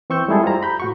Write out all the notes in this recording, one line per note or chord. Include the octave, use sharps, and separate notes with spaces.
E3 C4 C#6 E6 G6
G3 G#3 E4 G#4 A4
F4 G4 C5 A#5
A#5 B5 G6
A2 F#4 C#6